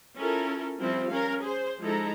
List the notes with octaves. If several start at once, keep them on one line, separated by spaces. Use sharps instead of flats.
C#4 E4 F4 A4 A#4
F3 G3 C4 E4 F4
C#4 A#4 F5
G#4 C5
F3 G#3 D#4 E4 A4 A#5